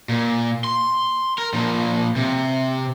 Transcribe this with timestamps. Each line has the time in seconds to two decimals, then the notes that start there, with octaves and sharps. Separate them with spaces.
0.09 A#2
0.64 C6
1.38 A#4
1.54 A#2 F3
2.16 C3